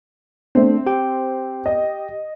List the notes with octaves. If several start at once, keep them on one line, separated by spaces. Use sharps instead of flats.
A3 C4 D4
G4 G5
D#5